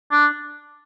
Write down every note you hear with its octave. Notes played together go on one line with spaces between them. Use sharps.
D4